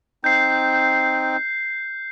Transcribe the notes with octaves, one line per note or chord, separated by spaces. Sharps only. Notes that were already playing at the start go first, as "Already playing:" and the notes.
C4 D#4 G6 C7